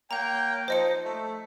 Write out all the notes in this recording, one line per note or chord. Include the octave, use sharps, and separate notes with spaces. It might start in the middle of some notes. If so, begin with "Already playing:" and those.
A#3 C#5 F#5 G5 A#5
F3 D#4 C5 D#5 C#7
A3